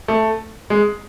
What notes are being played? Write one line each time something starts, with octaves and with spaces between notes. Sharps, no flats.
A3
G#3